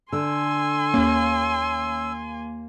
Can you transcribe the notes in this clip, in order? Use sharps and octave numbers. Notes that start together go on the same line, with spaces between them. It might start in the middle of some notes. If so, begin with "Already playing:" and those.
D3 G#5 C6 E6
D#2 A#3 C#4